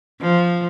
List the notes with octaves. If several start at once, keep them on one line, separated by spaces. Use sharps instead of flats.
F3